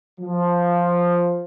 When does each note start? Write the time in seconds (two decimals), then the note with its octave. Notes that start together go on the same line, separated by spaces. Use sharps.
0.20 F3